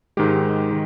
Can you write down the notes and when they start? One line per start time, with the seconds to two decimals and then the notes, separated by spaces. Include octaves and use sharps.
0.17 G#2 D#3 G#3 G4
0.71 D#3